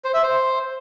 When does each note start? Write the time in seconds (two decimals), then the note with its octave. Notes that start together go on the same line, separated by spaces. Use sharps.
0.04 C5
0.14 E5
0.23 C5